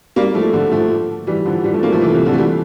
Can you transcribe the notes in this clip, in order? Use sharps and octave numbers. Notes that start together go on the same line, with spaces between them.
G3 A#3
F3 A3
D3 F3
F3 A3
E3 G3
D3 F3
E3 G3
F3 A3
G3 A#3
F3 A3
C3 E3
C3 E3
D3 F3
A3
E3 G3